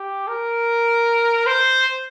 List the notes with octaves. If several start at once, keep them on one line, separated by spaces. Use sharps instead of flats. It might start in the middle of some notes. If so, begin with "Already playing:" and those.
Already playing: G4
A#4
C5